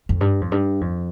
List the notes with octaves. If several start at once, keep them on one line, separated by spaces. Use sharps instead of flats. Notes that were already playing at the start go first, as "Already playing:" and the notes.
F2
G2
F2
G2
F2